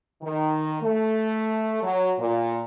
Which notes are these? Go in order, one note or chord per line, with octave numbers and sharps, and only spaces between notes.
D#3
A3
F#3
A#2